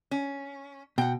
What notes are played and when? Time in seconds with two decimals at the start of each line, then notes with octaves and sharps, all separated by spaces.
0.11 C#4
0.98 B2 F#5 G5